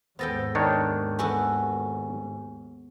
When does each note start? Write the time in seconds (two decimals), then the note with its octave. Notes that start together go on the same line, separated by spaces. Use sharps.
0.19 D#2 G#2 B3 A4 C5 G5 A6 A#6
0.55 D#3 D4 C#5 G6
1.19 B3 F#4 A4 G#5